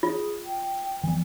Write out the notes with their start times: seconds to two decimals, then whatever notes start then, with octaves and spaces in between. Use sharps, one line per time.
0.03 F4 G#4
0.45 G5
1.03 E3 F3 B3 G#5